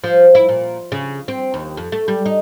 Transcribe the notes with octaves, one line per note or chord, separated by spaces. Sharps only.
F3
E4
A#2
C#3
C4
D#2
F2
A3
G3
D#4